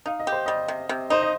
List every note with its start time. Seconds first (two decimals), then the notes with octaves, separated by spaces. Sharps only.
0.06 D#4 F5
0.19 D#5
0.27 G4
0.32 C5
0.46 G3 D#5
0.68 C3
0.89 C3
1.10 D#4 C5
1.22 D#5